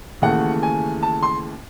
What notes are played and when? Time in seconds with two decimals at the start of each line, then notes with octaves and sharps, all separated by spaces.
0.22 D#2 C#3 E3 A3 F#5
0.63 G#5
1.03 A5
1.23 C6